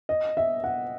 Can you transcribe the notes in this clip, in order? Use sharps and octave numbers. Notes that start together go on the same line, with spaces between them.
D#5
E5
F#5